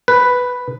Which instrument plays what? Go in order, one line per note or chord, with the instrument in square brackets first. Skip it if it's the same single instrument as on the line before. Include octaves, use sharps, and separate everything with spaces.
[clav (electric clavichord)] B4